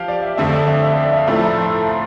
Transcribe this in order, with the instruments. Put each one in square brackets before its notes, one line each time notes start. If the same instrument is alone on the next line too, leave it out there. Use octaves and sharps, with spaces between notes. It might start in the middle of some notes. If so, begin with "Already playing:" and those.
Already playing: [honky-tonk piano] F3 G4 [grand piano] F5 G5
[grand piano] D5
E5
[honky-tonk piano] F2 D3 A3 [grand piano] E5
[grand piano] D5
E5
E5
E5
D5
E5
F5
[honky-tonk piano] A2 F3 A3 E4 A4
[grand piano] A5
A#5
C6
A#5
C6